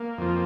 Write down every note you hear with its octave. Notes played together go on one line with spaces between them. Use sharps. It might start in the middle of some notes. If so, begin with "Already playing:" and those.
Already playing: A#3
F2 F3